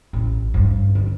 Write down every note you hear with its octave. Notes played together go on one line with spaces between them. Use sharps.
A1
G2
D3